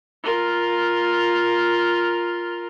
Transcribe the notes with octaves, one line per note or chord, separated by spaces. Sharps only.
F4 A#4